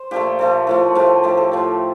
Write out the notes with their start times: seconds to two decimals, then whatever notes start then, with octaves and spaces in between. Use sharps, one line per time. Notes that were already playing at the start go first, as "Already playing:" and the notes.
Already playing: C5
0.11 A#2 F3 A3 G4
0.39 A#2 F3 A3
0.67 A2 F3 A3
0.95 A2 F3 A3 G4
1.23 A2 F3 A3 G4
1.37 A4
1.52 A2 F3 A3